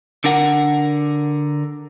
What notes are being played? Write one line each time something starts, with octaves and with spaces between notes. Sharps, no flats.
D3 D4 A#4 F#5